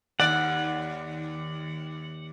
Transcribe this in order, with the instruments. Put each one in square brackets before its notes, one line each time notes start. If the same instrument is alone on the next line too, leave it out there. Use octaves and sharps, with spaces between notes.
[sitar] D#2 D5 [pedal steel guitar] F#5